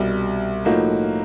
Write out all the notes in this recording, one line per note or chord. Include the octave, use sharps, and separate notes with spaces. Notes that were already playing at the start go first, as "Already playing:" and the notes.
Already playing: C2 B2 G3
A2 F3 A#3 D#4 F#4